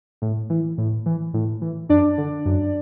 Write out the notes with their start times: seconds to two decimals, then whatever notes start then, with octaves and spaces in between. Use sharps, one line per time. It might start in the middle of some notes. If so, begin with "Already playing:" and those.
0.22 A2
0.50 E3
0.78 A2
1.06 E3
1.34 A2
1.61 E3
1.89 F#2 D4 D5
2.18 D3
2.45 F#2